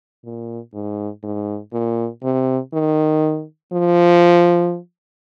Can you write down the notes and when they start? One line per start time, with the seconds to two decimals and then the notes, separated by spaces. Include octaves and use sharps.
0.24 A#2
0.74 G#2
1.23 G#2
1.73 A#2
2.23 C3
2.74 D#3
3.73 F3